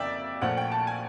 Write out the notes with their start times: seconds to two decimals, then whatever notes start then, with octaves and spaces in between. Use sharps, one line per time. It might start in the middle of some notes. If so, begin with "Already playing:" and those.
Already playing: F2 C#3 A#3 D5 E5 G5
0.41 A#1 A#2 F3 A3 C#4 F#5
0.57 G5
0.72 A5
0.87 G#5